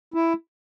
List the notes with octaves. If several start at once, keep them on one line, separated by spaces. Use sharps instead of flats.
E4